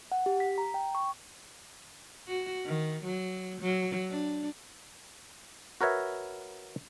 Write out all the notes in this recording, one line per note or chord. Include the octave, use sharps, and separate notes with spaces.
F#5
G4
B6
A#5
G5
C#6
F#4
D#3
F#3
F#3
D4
F#4 A#4 B4 C#5 E5